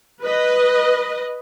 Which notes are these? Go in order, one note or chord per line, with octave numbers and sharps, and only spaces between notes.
B4 D#5